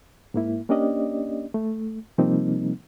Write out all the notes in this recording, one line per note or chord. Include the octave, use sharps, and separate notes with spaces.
G#2 A#3 E4
A#3 C#4 D4 G4 D5 D#5
A3
C3 F3 G3 A#3 C4 D#4